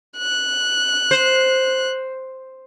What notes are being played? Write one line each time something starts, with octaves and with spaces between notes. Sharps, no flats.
F#6
C5